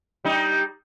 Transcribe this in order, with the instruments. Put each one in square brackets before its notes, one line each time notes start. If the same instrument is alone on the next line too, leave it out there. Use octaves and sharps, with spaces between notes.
[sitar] G3 D#4